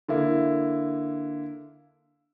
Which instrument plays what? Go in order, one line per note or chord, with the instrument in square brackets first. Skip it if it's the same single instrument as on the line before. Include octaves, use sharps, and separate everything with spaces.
[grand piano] D3 A#3 E4